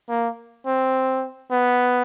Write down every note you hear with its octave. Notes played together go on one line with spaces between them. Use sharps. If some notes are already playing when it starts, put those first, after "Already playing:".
A#3
C4
B3